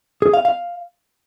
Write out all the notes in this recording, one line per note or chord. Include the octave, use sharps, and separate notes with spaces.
G#4
F5
F5